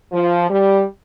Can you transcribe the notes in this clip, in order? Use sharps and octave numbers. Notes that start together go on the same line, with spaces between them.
F3
G3